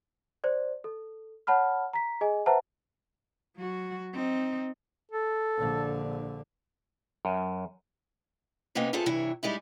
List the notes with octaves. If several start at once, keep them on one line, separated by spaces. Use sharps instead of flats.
C5 D5
A4
C#5 F#5 A5 B5 F6
A#5 B6
G#4 D#5 G#5
B4 C5 E5 F#5 A5 A#5
F#3 F#4
C4 D#4
A4
A#1 D3
F#2
C3 A#3 B3 C#4 D#4
C3 A3 F4 G#4 A4 A5
G2 C3 E3 E4 C#5
G3 G#3 D#4 E4